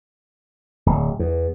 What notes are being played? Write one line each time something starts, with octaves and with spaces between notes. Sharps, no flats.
D1
E2